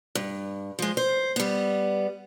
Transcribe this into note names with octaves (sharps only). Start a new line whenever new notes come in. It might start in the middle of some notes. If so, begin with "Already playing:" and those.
G2
F3 G#3
C5
G3 B3